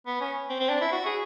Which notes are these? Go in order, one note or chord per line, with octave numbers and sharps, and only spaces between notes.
B3
C#4
C4
C4
D4
E4
F#4
G#4